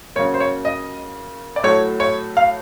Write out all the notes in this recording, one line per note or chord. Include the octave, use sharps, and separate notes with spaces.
C#3 F#3 A#3 C#5
C5
C#5
D#5
D5
A2 F#3 A3 C#5
C#5
F5